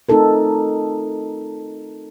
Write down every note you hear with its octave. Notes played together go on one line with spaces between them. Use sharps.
A3 C4 D#4 F4 A4 A#4